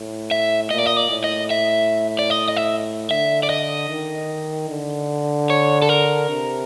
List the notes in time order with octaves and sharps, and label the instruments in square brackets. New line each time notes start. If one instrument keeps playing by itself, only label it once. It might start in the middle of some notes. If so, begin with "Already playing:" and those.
Already playing: [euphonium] A2
[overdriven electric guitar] E5
[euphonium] A#2 [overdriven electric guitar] D#5
[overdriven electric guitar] D5
D#5
D5
[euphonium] A2
[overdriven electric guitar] D#5
E5
D5
D#5
D#5
E5
[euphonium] D3 [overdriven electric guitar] E5
[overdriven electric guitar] D5
D#5
[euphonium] D#3
D3
[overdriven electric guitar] C#5
A4
A#4
[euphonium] C3